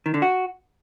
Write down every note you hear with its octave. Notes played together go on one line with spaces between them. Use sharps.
D#3
D3
F#4